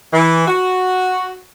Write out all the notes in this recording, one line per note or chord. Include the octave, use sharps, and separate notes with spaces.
E3
F#4